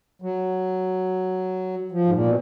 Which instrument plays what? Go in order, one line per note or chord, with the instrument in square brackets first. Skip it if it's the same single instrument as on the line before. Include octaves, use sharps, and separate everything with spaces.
[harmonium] F#3
F3
G#2
A#2
B2